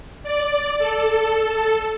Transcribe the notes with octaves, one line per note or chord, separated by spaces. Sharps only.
D5
A4